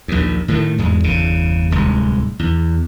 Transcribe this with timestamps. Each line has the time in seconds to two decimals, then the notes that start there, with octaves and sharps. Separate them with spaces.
0.08 A#1 D#2
0.48 A2 D#3 A3
0.78 E2 G#2 G#3
1.04 G1 E2 C#3
1.71 D1 C2 G#3
2.39 E2